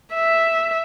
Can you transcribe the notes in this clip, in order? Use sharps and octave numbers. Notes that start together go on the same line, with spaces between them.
E5